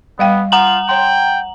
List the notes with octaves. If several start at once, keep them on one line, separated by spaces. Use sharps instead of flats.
G3 B3 F5 G5
F4 F#5 A#5 F#7
C#5 G5 C6